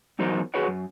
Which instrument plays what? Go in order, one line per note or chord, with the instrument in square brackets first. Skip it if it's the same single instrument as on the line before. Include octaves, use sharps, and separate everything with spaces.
[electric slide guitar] E2 F#3 D#4 A#4 C5 D#5
F#4 G#4 B4 C#5 D#5 F#5
F#2